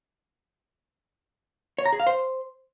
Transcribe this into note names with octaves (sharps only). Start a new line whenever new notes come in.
C#5
A#5
G#4
F5
C5